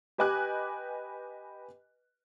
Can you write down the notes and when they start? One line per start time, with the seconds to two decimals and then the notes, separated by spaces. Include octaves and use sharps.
0.18 G4 B4 D#5 G#5 D6 F#6